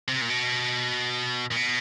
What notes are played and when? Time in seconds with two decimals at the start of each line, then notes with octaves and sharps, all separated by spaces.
0.08 C3
0.21 A#2
0.30 B2
1.52 A#2
1.56 B2